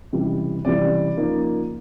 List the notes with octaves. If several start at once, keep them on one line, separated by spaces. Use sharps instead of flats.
C#2 C3 E3 G3
C#2 C3 E3 G3 D5
C#3 F3 A#3 D#4